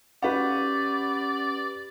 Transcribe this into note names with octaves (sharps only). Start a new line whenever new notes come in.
C#4 G4 B4 D5 F#5